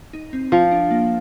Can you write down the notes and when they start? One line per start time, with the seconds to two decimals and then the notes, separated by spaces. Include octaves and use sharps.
0.13 D#4
0.33 C4
0.52 F3 F4
0.71 D4
0.91 A#3